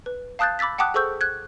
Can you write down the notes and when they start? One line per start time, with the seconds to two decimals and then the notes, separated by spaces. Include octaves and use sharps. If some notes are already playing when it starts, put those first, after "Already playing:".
0.06 B4
0.39 F5 A5 D#6 F#6 G6 A6
0.59 B5 D6 E6 A6 B6
0.78 F#5 G5 A5 D6 D#6 F#6
0.94 G#4 A4 C5 C#6 E6 G6
1.21 F#6 G#6